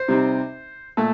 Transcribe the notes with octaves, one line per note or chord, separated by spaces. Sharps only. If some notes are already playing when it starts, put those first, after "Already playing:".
Already playing: C5
C3 G3 C4 D#4
A#2 A3 A4